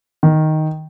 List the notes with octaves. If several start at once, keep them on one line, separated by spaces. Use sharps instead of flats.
D#3